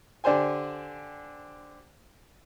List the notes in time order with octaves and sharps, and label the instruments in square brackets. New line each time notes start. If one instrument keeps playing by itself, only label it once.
[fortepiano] D3 D4 G4 C5 G#5